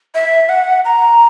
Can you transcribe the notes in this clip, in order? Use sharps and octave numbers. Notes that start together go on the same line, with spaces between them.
E5
F#5
A#5